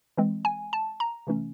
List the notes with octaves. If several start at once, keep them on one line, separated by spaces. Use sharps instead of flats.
E3 G#3 C4
G#5
A5
A#5
C3 E3 A3 C#4